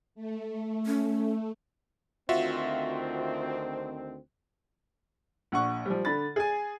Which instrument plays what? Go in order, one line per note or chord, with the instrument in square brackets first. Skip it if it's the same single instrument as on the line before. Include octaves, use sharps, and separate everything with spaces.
[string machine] A3
[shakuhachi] C#4
[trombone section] D2 D#3 C4 [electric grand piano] F4 F#4 E5
[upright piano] A#1 F#5 C#6
F3 G3
D3 B5 A6
G#4 G#5